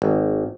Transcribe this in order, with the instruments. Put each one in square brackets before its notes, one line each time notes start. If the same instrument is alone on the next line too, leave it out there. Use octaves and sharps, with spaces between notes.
[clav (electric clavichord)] G#1